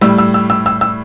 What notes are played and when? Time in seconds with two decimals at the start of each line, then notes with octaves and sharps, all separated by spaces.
0.01 A2 G3 E6
0.18 E6
0.34 E6
0.50 E6
0.66 E6
0.81 E6